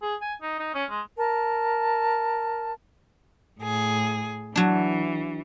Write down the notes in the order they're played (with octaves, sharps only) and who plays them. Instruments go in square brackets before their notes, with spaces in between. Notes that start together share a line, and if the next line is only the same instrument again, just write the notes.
[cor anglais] G#4
G#5
D#4
D#4
C#4
G#3
[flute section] A#4 A5
[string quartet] A2 G#4
[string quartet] E3 [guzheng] F#3 D4